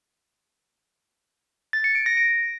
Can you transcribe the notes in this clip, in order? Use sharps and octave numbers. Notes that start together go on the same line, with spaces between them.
A6
C#7
D7
A#6
D7